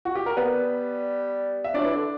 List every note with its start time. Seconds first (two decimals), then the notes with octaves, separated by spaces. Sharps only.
0.05 F#4
0.15 G4
0.26 A#4
0.37 G3 B3 B4
1.64 E5
1.74 F#3 D4 D5
1.84 E3
1.95 D3